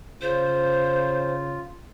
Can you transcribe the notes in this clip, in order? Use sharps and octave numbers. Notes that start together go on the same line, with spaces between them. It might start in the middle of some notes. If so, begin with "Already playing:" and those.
C#3 F4 C5